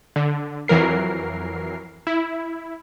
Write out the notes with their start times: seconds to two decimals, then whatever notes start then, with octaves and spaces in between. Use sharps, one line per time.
0.16 D3
0.68 F2 E3 F#3 A#4 C7
2.07 E4